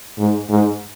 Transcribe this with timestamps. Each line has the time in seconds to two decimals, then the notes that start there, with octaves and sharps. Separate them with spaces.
0.18 G#2
0.49 G#2